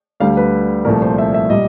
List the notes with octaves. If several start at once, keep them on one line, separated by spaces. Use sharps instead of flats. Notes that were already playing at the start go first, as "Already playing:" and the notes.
D2 D3 G3 F5
B4
C2 A#2 F3 A3 A#4
C5
E5
E5
A#2 G3 D#5